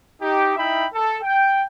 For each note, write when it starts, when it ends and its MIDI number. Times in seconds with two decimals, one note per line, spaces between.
0.21 0.54 63
0.21 0.54 67
0.56 0.86 63
0.56 0.86 64
0.56 0.86 76
0.56 0.86 79
0.56 0.86 83
0.94 1.17 69
1.23 1.64 79